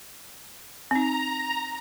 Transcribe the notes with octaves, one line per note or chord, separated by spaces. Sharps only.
C4 D#4 A#5